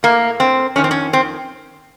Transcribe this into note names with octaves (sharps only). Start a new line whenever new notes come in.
A2 A#3
C4
F2 D#3 C#4
C4
C#4
C4